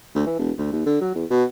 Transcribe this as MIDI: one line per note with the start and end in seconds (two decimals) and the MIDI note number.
0.15 0.22 38
0.26 0.35 52
0.39 0.51 28
0.58 0.72 38
0.72 0.86 39
0.86 0.96 50
1.01 1.12 54
1.15 1.25 40
1.30 1.43 47